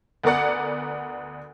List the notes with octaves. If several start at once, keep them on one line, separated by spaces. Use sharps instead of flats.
D2 B3 A#4 D5 F#5